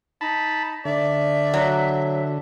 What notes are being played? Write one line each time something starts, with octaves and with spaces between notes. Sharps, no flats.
D#4 A5 B5
D3 D5 E5
F#3